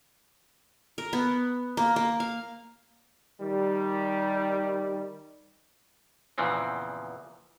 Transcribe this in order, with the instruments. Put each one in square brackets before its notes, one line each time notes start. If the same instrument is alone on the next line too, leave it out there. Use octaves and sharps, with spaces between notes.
[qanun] A#4
B3
A#3
A#3
F5
[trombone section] D#3 G3
[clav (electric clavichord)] E2 A#2 C#3 E3 F3 C4